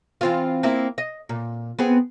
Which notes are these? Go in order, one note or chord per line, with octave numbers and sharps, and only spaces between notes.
E3 C4 F4
A#3 C4 E4
D#5
A#2
B3 C4 G#4